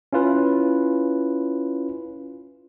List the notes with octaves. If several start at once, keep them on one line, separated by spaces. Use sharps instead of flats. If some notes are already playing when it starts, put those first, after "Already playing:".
C#4 E4 F4 B4